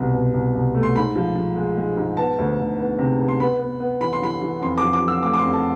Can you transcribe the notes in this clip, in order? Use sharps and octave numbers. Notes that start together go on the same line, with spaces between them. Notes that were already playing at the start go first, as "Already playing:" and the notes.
Already playing: C2 B2
B2
C2
C2
A3
C6
G#2 B5
F3
F3
G#3
G#3
G#2
B3 A5
D2
D2
B3
C3
B3
C6
B3 B5
B3
B3
E3 B5
C6
E3 B5
E3
F2 C6
F3 D6
D6
F3
E6
A3 D6
D6
F2 C6
A5